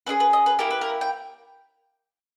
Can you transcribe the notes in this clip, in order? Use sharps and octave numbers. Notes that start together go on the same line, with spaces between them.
C#4 E4 G#4 B4
B4
D#5
B4
A#3 E4 G4 A#4
B4
A#4
G5